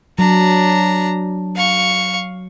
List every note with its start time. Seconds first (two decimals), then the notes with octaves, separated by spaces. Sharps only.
0.19 F#3 D4 A#5
1.56 F5 C#6